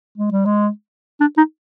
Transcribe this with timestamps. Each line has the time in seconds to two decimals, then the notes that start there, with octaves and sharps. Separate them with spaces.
0.18 G#3
0.32 G3
0.46 G#3
1.20 D4
1.37 D#4